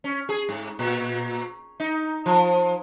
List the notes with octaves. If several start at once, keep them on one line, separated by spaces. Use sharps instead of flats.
C#4
G#4
G#2
A#2
D#4
F3